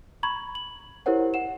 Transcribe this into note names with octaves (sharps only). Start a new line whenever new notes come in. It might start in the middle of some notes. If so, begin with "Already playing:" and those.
A#5 B5 C#6 G#6 F#7
F#7
E4 G4 A#4 C5 C#5 F#5
F#5 E7